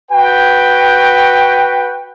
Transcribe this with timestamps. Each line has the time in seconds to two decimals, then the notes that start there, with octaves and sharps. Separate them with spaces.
0.11 F#4 B4 G5